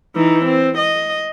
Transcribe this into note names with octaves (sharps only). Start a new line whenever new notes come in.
E3 D#4
C4
D#5